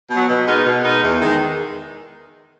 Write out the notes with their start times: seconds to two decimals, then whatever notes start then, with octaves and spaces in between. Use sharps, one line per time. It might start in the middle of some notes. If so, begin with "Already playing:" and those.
0.10 B2 F#3
0.29 B2
0.47 G#3 B3 D#4 A#4
0.66 B2
0.84 G#3 B3 D#4 A#4
1.03 E2
1.21 D#3 G#3